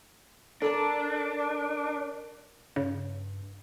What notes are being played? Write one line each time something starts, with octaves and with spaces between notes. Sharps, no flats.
D4 A4 A#4 A5
G2 C#3